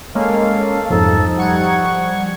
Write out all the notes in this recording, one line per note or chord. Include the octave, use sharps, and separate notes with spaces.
G#3 A#3 C#4 A4 F5
C2 F2 G#2 F3 D#4 A4
G3 F#5 C#6 G#6